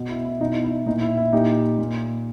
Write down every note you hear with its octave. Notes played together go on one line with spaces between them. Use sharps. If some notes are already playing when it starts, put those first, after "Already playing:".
Already playing: B2
E4
E4
B2 D#4
E4
A#2 D#4
E4
E4
A#2 D#4 G4
A#2